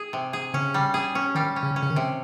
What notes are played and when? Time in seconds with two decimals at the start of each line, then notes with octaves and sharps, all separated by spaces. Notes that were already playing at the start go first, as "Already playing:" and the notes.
Already playing: G#4
0.13 C3
0.33 G#4
0.54 C#3 C#4
0.74 G3
0.94 G#4
1.15 C#4
1.35 D#3 G3
1.56 C#4
1.63 C#3
1.76 C#4
1.82 C#3
1.90 D#3
1.96 C3